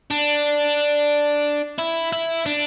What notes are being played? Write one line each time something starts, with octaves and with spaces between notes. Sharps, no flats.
D4
E4
E4
D4